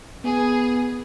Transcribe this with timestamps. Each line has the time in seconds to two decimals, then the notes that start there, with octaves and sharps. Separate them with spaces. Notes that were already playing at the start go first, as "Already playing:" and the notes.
0.24 B3 G#4